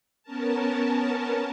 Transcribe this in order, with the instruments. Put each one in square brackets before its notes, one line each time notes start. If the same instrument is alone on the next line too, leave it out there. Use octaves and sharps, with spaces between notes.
[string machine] B3 C#4 A#4 A5